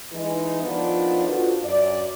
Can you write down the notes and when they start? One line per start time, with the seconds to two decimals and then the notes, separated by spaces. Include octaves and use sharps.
0.12 E3 G#3 D#4
0.62 D#3 F3 B3 D4 F4 C5
1.26 D4 F4 F#4 A4 B4 C5
1.63 F#2 D5